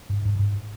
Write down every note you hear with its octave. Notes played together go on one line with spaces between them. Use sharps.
G#2
G#2
G#2